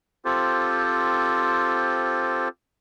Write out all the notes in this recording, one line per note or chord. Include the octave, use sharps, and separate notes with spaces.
C4 F4 G4 A4 C5